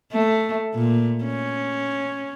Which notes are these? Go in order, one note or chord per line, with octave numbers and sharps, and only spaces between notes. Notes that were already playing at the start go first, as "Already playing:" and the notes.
A3
A#2
C#4